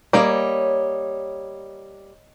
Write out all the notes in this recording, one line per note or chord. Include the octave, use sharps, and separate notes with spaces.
G3 A#3 C#5 D#5